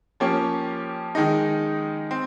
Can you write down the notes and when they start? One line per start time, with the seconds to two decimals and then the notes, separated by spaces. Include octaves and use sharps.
0.20 F3 A#3 C#4 G4
1.15 D#3 G#3 D#4
2.11 C4